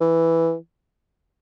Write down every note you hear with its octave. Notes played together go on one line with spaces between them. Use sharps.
E3